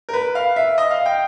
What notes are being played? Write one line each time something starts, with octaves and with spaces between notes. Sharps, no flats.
A#4
B4
F5
E5
D#5
F5
G5